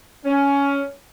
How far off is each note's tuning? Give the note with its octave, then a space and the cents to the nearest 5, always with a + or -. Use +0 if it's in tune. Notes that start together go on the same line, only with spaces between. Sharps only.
C#4 +15